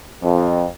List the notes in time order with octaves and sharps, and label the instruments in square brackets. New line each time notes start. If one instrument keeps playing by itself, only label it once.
[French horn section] F2